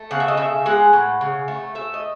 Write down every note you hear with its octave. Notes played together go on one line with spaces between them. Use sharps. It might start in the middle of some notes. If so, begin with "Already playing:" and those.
Already playing: A3
C#3 F#5
E5
D#5
C#3 E5
G#3 F#5
A2
C#3
A3
A3 E5
D#5